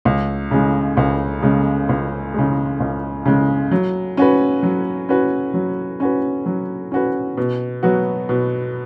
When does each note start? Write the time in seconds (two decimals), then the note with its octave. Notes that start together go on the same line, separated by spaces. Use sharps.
0.05 C#2
0.51 C#3 G#3
0.97 C#2
1.42 C#3 G#3
1.89 C#2
2.34 C#3 G#3
2.80 C#2
3.25 C#3 G#3
3.71 F#3
4.17 C#4 F#4 B4
4.63 F#3
5.09 C#4 F#4 B4
5.54 F#3
6.00 C#4 F#4 B4
6.46 F#3
6.92 C#4 F#4 B4
7.37 B2
7.83 F#3 B3 F#4
8.29 B2